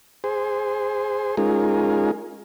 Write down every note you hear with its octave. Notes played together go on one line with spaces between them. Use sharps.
G#4 C5
G#3 C#4 D#4 F4 G#4 A#4